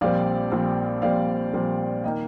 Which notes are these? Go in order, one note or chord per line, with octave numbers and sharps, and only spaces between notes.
A#1 A#2 G3 C4 D5 F5
A#1 A#2 G3 C4
A#1 A#2 G3 C4 D5 F5
A#1 A#2 G3 C4
D#3 A#3 D#5 G5